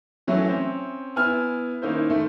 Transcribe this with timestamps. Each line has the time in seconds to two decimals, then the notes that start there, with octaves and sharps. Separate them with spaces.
0.27 E3 F#3 A3 C#4 E4
0.48 C4 C#4
1.16 B3 E4 G#5 F6
1.82 D#3 A#3 C#4 D#4 E4 C5
2.09 G#2 D#3 A3